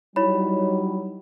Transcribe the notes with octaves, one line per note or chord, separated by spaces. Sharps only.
F#3 G3 D#4 E4 C#5 B5